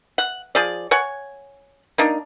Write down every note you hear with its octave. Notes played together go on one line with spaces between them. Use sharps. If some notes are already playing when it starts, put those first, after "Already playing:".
F#5
F3 G#4 D5
C#5 F#5 G#5
A#3 D4 D#4